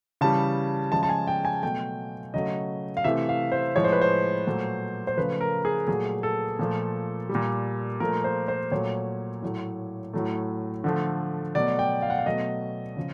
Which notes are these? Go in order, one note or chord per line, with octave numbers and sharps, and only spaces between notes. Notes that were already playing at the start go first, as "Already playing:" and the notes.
C#3 E3 G3 A5
C#3 F3 G#3 A5
A5
G#5
G5
G#5
B2 F#3 A3 G5
C#3 F#3 A3 D#5
F5
C3 E3 A3 E5
F5
C5
A2 F3 G#3 C#5
C5
B4
C5
A#2 F#3 A3
C5
C#3 F3 A3 B4
A#4
G#4
A#2 F#3 A3 G#4
A4
A#2 F3 A3
G3
A#2
A#2 F3 A3 A#4
C5
C5
A#2 F#3 A3 C#5
A2 F#3 A3
A2 F#3 A3
D3 F3 A3
B2 F#3 A3 D5
G5
F5
F#5
F5
B2 F#3 A3 D#5
C#3 F3